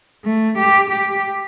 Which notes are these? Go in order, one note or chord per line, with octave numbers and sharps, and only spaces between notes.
A3
G4
G4